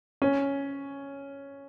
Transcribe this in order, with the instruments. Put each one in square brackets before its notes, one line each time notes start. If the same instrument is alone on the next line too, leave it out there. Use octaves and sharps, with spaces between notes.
[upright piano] C#4